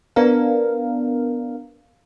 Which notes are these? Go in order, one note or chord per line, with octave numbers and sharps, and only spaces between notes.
B3 D4 A#4 F5